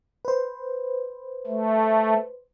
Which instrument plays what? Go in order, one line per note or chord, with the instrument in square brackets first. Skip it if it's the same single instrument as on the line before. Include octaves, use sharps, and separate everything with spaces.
[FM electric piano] B4 C5
[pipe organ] A3